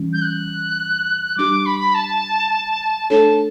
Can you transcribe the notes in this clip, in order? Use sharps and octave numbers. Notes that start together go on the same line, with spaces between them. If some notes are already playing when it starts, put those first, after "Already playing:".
Already playing: E3 G3 C#4
G6
F#6
G3 D4 G4 D6
B5
A5
A3 D4 A4 C#5 A5